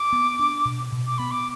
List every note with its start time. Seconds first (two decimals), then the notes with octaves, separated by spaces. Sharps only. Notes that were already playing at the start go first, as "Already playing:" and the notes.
Already playing: D6
0.13 B3
0.39 D4
0.65 B2
0.92 B2
1.07 D6
1.18 B3 B5
1.31 D6